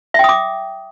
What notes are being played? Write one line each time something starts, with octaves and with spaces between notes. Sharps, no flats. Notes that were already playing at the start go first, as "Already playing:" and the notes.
E5 G5 D6 D#6